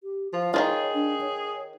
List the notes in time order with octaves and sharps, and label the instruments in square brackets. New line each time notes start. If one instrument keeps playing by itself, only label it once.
[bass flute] G4
[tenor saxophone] F3 [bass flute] F5
[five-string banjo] D#3 F3 F4 [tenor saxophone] G#4 [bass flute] C#5
[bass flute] D4
C#5